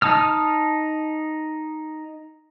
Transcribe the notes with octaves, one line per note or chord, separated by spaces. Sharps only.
D#4 A5 D#6 F6